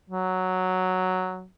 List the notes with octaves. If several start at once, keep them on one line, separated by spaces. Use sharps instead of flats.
F#3